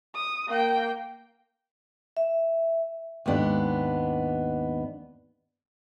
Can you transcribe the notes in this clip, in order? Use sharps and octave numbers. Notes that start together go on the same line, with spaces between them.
D#6
A#3 G5
E5
D#2 G#2 B3 D4